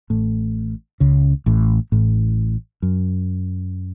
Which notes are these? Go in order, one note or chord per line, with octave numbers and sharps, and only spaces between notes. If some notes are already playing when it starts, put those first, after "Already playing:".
A1 A2
C#2 C#3
A1 A2
A1 A2
F#2